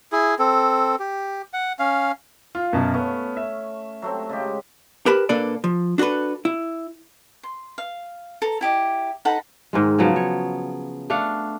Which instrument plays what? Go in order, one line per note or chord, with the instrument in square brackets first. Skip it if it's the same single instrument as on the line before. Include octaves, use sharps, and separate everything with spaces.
[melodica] E4 G#4
C4 A4
G4
F#5
C#4 F5
[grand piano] F4 [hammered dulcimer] F5
[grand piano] F#2 B2 A5
[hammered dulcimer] A3 C#4 [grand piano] B3
[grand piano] E5
[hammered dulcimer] F#3 A3 C4
C#3 G#3 G4
[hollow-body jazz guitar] G4 A#4 B4 A5 B5
A#2 A#3 D4 A4 B4 D5
F3
D4 F#4 G#4 A4 B4
E4
[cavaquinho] C6
F5
A4 A#5
E4 G4 D#5
D#4 A4 F#5 B5
[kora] G#2 D#3 G#3
C#3 F3 F#3 B3
C#5
A3 D4 F5 F#5